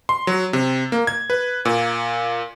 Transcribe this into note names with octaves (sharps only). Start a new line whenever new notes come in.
C6
F#3
C3
A#3
G#6
B4
A#2